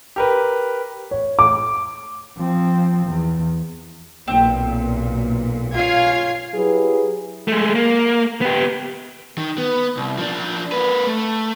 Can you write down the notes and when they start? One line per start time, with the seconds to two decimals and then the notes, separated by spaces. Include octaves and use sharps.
0.16 G4 A#4 B4
1.11 C#5
1.39 D6
2.37 F3 C4
3.07 E2
4.28 B1 A#2 C4
5.75 C#4 F4 F5 C6 G#6 C7
6.55 F#3 E4 G4 G#4 B4
7.48 G#3 A3
7.75 A#3
8.41 B3 G4
9.38 D#3
9.58 B3
9.97 C2
10.18 F3 D4
10.72 A#3 B4
11.07 A3